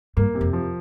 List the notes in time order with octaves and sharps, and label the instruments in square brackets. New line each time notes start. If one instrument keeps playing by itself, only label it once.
[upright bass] G2 [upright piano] A#3
[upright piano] C3
[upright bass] F2
[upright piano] F3